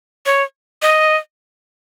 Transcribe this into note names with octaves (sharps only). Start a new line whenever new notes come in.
C#5
D#5